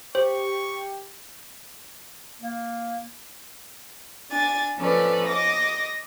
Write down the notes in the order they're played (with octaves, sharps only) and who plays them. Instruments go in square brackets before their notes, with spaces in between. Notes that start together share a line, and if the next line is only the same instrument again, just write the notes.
[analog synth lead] G4 [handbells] C5 [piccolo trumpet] C#6
[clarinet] A#3
[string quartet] D4 G#5 A6
F3 C#4 A4 B4 D5
D#5 D6 A#6